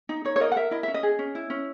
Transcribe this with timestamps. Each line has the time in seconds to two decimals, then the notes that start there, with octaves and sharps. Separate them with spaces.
0.09 D#4
0.25 D#4 C#5
0.36 C#5
0.40 A#4 D#5
0.52 F#5
0.56 A#4 E5
0.71 E4 D#5
0.83 C#4 E5
0.94 D#5
1.03 G#4
1.19 C#4
1.35 E4
1.50 C#4